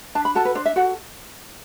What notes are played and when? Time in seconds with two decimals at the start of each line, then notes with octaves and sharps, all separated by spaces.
0.15 D4 A5
0.25 B5
0.35 F#4 A4 A5
0.45 B4
0.55 D4 C5
0.66 E5
0.76 F#4 A4 F#5